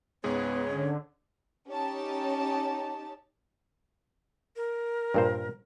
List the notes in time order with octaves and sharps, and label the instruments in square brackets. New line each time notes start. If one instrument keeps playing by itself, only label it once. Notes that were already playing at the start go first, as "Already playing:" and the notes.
[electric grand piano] C#2 G#2 G#4 [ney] B3 [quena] C#5
[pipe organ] D3 [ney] C#4
[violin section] C#4 D#4 G4 A5
[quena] A#4
[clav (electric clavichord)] G2 A#2 C5